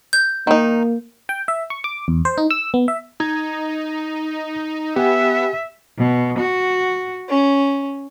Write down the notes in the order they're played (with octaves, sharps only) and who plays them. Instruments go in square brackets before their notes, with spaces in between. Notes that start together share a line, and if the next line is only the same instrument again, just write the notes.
[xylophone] G6
[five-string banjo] D#3 D#4 [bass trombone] A#3
[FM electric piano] G5
E5
C#6
D6
E2
C5
D#4
E6
B3
E5
[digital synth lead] D#4 [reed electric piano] A#5 G#6
[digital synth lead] B3 [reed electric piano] G4 F#5 G#5 [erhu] E5
[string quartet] B2
F#4
C#4